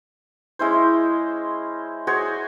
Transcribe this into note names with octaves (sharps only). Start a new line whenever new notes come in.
G#3 C#4 E4 C5
F#4 G#4 C5 C#5